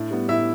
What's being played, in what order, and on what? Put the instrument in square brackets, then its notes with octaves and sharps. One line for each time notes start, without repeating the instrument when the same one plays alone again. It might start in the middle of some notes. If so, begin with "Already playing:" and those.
Already playing: [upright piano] A2 D4
G3 B3
A2 E4 E5